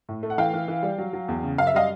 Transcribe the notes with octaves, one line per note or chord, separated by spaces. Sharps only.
A2
A3
F#5
E3 F5 G5
E3
E3
G3
F#3
F#3
E2
C#3
F#2 F5
E5
G3 D#5 F5